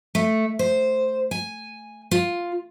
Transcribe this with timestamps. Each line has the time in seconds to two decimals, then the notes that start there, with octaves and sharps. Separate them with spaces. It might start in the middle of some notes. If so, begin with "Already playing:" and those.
0.15 A3
0.59 C5
1.31 G#5
2.11 F4